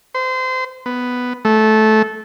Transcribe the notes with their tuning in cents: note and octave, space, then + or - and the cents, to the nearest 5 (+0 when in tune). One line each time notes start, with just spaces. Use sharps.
C5 -25
B3 +5
A3 -15